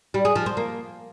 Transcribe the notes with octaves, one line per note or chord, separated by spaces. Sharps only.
G3
G#4
F3
C4
A#3